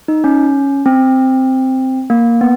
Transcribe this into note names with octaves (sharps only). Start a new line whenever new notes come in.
D#4
C#4
C4
A#3
B3